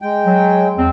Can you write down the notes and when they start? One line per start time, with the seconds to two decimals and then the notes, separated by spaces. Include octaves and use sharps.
0.02 G#3 G5
0.25 F#3
0.77 E2 C4